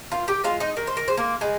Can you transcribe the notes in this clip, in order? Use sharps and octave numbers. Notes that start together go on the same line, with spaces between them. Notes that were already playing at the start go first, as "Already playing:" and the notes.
D#3 F4 F5
G4 G5
G#3 F4 F5
D#4 D#5
D#3 A#4
C5
A#4
G#3 C5
A#3 A#4
C#3 G#3 G#4